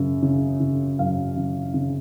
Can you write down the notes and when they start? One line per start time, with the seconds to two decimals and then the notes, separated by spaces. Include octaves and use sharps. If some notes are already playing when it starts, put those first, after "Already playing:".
Already playing: F#2 C#3
0.22 C#3
0.60 C#3
0.99 F#2 F5
1.37 C#3
1.74 C#3